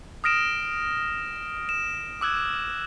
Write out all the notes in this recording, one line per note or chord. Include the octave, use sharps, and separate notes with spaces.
D#6 F6 A#6 D7 E7
E7
D6 E6 F#6 G#6